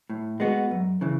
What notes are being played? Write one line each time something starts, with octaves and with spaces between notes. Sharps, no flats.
A2
G#3 B3 F#4
F#2
C#3 E3